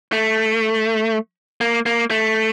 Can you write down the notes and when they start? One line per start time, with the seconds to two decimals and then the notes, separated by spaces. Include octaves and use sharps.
0.13 A3
1.61 A#3
1.86 A#3
2.11 A3